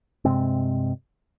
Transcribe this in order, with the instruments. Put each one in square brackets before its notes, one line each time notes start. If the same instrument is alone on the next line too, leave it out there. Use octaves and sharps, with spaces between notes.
[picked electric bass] G2 C3 G#3 C4